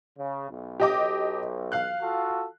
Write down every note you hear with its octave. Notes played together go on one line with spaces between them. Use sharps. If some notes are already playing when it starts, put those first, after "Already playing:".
C#3
B1
G4 D#5 D6
F5 F#6
F4 F#4 A4